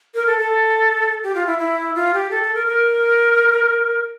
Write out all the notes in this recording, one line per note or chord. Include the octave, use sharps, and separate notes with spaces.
A#4
A4
A4
G4
F4
E4
E4
F4
G4
A4
A4
A#4
A#4